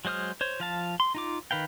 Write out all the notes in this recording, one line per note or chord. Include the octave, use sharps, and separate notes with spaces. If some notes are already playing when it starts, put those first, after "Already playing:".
F#3 G#3 C5 D#6 F6
C5 C#5
F3 F5 A5
C6
D#4 F4 D6
D#3 B4 F5 G5